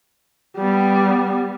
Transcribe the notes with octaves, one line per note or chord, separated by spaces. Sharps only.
G3 B3